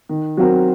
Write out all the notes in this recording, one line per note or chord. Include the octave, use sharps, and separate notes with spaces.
D#3
F#3 C4 F#4 A#4